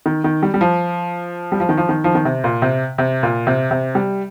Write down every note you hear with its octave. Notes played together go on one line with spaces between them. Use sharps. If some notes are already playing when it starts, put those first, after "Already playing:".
D#3
D#3
G3
G3
F3
G3
F3
D#3
F3
D#3
F3
D#3
C3
A#2
C3
C3
A#2
C3
C3
G3